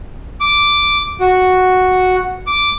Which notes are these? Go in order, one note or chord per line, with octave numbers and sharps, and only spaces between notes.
D6
F#4
D6